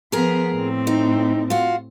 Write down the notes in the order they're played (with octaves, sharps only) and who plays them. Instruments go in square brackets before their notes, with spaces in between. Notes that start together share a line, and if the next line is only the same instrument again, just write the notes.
[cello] F3 B3 [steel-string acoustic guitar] G#4 A#4
[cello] A2 C4
[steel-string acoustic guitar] D#4
F4 F#4